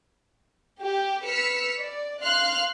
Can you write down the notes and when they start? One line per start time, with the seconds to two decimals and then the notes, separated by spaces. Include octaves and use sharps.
0.81 G4
1.25 B4 E6 F6 B6 C#7
1.79 D5
2.22 F5 C6 F6 F#6